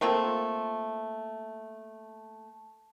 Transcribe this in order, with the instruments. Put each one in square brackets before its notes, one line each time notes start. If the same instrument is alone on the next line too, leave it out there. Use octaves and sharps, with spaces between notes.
[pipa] A3 A#3 C4 F4